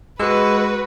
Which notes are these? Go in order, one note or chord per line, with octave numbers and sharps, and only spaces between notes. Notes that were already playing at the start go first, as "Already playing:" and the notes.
G#3 F#4 B4 E6